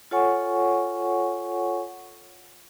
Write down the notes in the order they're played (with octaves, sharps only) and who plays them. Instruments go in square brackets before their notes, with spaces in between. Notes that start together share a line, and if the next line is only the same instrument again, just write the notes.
[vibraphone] F4 A4 C#5 F#5 G#5 C#6